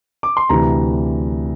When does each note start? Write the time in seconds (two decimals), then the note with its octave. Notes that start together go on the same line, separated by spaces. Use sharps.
0.23 D6
0.37 C6
0.49 D2 C3 E3 A#5